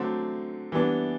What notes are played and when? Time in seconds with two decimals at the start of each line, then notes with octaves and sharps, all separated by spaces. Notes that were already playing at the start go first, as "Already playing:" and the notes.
Already playing: D3 F#3 A3 C4
0.72 E3 G3 B3 D4